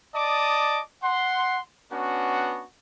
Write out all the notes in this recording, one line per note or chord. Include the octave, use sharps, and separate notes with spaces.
D5 D#5 A5 D6 D#6
F#5 C6
B3 C#4 D4 F#4